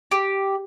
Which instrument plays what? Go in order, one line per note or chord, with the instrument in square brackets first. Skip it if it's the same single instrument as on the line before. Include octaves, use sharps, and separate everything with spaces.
[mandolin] G4